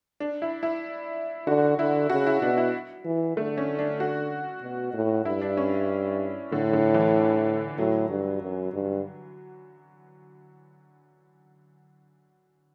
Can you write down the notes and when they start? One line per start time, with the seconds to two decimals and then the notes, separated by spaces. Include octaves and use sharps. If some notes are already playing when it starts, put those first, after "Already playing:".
0.20 D4
0.42 E4
0.63 E4
1.47 D3 F#4
1.79 D3 E4
2.10 C#3 F#4
2.26 E4
2.42 B2 D4
2.57 E4
3.05 E3
3.37 D3 A3
3.58 C#4
3.79 D4
4.00 F#4
4.62 B2
4.94 A2
5.25 G2 E4
5.41 D4
5.57 C#4
6.52 A2 D3
6.73 D3
6.94 E3
7.78 A2 F#3
8.10 G2
8.42 F#2
8.73 G2